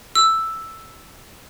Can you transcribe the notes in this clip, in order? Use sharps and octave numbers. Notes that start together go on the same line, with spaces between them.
E6